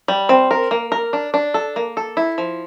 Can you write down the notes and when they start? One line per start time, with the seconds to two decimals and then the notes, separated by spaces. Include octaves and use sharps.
0.08 G3
0.29 C4
0.51 A#4
0.71 A#3
0.92 A#4
1.13 D4
1.34 D4
1.54 A4
1.76 A#3
1.97 A4
2.17 E4
2.38 F3